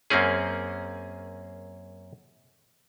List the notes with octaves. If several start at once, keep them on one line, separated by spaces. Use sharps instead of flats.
F#2 A#3 C4 C#4 G#4